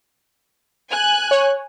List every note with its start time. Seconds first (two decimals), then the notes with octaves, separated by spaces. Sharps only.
0.92 G#5 F#6
1.31 C#5